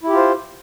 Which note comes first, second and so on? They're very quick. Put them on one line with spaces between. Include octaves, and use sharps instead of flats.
E4 G4 F4 C5